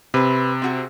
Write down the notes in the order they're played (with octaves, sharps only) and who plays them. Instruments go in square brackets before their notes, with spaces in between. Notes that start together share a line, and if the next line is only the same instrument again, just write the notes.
[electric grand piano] C3 [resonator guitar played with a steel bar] C4 B4
[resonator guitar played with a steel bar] C4 F#4 G#4